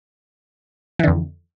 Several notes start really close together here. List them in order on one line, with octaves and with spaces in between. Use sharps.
E3 D3 F2